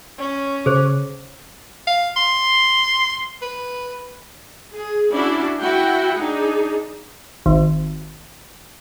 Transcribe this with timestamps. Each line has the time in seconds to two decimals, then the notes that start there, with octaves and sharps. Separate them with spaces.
0.19 C#4
0.66 C#3 G#4 C5
1.87 F5
2.16 C6
3.42 B4
4.72 G#4
5.12 C#4 D4 E4 F#4 D5
5.61 E4 F#4 F#5 G5
6.16 D4 D#4 G#4
7.46 G#1